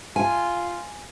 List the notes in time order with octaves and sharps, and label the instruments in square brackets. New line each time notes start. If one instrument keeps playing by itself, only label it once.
[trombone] F4 [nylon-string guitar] G#5